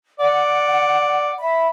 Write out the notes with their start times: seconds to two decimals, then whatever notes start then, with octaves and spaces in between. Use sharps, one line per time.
0.20 D5 F#5
1.40 E5 B5